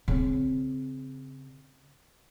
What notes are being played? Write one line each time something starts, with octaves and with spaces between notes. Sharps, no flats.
C#3 C4